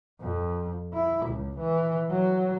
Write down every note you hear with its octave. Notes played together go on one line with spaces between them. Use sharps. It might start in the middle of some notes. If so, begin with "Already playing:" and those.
F2
E4
C#2
E3
F#3